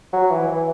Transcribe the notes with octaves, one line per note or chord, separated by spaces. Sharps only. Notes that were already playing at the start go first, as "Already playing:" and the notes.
F#3
E3
E3